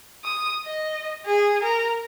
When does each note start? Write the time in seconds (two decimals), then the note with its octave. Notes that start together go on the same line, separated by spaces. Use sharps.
0.24 D#6
0.65 D#5
1.26 G#4
1.63 A#4